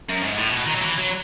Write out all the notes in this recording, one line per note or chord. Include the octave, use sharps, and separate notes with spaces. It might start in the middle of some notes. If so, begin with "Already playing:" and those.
F#2
G#2
A2
B2
D#3
F#3
E3
F#3